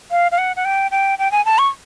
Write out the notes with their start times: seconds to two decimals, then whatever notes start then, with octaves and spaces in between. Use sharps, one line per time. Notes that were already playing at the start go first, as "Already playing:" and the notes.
0.11 F5
0.32 F5
0.38 F#5
0.56 F#5
0.65 G5
0.91 G5
1.19 G5
1.32 G#5
1.45 A5
1.58 C#6